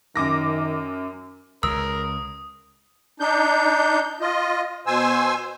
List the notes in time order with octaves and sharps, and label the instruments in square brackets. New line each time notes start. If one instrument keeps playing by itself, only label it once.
[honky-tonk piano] F#2 D6 A#6 [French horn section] D#3
[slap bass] C#2 C#3 [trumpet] A#4 [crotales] D#6 [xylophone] E6
[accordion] D4 D#4 G6
F4 D#5
B2 C5 G#5 E6